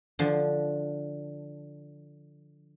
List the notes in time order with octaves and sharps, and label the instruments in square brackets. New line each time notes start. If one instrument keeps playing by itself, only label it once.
[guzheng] D3 F3